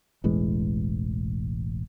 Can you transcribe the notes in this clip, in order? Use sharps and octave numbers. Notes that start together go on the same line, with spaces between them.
E1 A1 E3 G#3